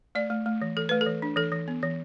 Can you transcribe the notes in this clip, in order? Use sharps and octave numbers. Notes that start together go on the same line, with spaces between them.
A3 D5
A3
A3
E3
E3 A4
A3 B4
A4
E3
D4
E3 A4
E3
B3
E3